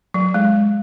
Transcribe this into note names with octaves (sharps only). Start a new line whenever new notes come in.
F#3
G#3